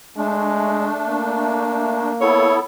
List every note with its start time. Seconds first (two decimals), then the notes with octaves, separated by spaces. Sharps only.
0.17 G#3 A3 D4
1.08 A#3
2.21 B3 E4 A4 C#5